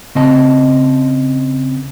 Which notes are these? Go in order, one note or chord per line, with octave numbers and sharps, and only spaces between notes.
C#3 C4 D#5 A5